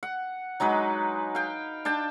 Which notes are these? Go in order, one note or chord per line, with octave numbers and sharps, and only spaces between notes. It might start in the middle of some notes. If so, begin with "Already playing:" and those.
F#5
F#3 G#3 D#4 B4
F5 G5
D4 G5 A5